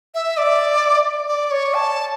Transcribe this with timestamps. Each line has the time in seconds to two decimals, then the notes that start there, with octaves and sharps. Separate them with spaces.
0.15 E5
0.37 D5
1.29 D5
1.51 C#5
1.74 A5